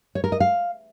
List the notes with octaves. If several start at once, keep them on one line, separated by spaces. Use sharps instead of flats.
C#5
A#4
D#5
F5